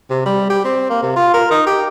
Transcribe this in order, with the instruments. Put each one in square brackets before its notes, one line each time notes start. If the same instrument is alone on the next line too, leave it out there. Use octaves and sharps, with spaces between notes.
[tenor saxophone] C3
G3
G4
C4
A#3
C3
F4
A#4
D#4
G4